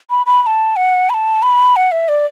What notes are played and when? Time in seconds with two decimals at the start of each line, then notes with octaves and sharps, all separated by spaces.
0.10 B5
0.26 B5
0.43 B5
0.47 A5
0.76 F#5
1.10 B5
1.14 A5
1.43 B5
1.76 F#5
1.92 E5
2.09 D5